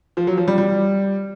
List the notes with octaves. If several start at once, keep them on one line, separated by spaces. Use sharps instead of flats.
F3
F#3
F3
G3
G3